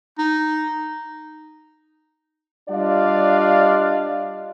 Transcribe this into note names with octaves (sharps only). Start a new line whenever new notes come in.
D#4
G3 D4 F4 D5 D#5 F5